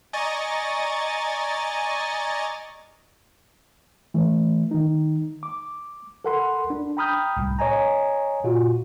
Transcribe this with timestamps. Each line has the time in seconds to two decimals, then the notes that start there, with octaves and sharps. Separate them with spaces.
0.13 D5 D#5 G#5 A#5 C#6 A6
4.14 E3 A3
4.71 D#3 D#4
5.43 D6
6.25 A4 A#4 F#5 B5 C6
6.70 D4
6.97 G5 A#5 B5 D#6 F6 G6
7.37 C2 A2
7.59 C#5 D#5 G#5 A#5
8.44 A#2 F4 F#4